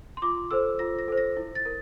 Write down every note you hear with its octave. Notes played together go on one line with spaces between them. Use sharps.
C6
F4 D6
A4 C5 E6
F4 A#6
A#6
A4 C5
A#6
E4
A6
A#4